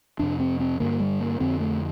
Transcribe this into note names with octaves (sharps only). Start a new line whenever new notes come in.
F2 C3 D4
C4
C4
G2 D3 A#3
G3
A#3
F2 D3 C4
A3